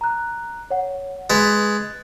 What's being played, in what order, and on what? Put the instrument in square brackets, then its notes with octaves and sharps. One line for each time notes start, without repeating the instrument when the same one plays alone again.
[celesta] A#5 F#6
C#5 F#5
[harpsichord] G#3 B4 [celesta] F#6 A6